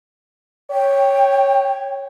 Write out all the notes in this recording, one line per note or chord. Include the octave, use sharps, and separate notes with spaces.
C#5 G5